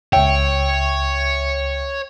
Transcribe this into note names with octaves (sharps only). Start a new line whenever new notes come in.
C#2 C#5 E5 G5